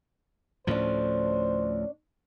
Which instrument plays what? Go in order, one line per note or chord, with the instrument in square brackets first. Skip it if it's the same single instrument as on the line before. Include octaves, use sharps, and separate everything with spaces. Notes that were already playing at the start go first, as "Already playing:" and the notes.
[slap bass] D2 A2 F3 [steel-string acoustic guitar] C#4 D4 [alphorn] C5